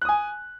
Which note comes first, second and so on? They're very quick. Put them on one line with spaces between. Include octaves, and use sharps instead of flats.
F#6 D#6 G#5